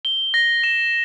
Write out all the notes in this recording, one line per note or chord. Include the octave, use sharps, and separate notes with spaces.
G7
A#6
E7